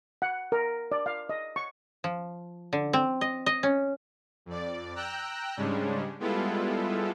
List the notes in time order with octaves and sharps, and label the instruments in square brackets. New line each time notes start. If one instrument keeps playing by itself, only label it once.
[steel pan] F#5
A#4
D5
F5
D#5
C#6
[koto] F3
D3
C4
D#5
D#5
C#4
[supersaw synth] F2 D5
G5 A#5 E6 F#6
G#2 C#3 G3 G#3 C#4 D4
G3 G#3 B3 E4 F4 A4